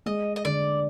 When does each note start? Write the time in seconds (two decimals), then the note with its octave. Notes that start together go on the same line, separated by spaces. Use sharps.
0.06 G#3 D#5
0.36 D#5
0.45 D3 D5